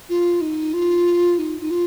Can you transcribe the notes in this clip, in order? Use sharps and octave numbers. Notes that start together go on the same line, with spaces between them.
F4
D#4
F4
D#4
D#4
F4